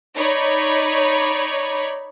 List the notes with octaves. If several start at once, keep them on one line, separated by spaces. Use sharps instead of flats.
D#4 C#5 D5 B5